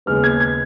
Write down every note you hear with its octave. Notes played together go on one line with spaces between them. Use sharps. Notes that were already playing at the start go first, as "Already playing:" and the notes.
D#2 C#3 G#3 B3 F6
G#6
G#6